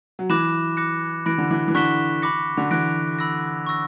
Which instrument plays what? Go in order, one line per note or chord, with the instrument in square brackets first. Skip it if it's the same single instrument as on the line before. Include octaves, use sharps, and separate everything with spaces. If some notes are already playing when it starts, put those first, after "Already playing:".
[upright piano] F#3
[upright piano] E3 [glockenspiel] B5 D6 F#6 A#6 E7
[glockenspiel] D6 F#6 A#6 C#7
[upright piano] E3 [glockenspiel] B5 F#6 A#6 D7
[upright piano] D3
E3
E3
[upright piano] D3 [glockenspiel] C#6 F#6 B6 E7 G7
[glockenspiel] B5 D6 A#6 C#7
[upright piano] D3
[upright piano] E3 [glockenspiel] F#6 A#6 D7
[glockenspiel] B5 E6 A#6
C#6 E6 A#6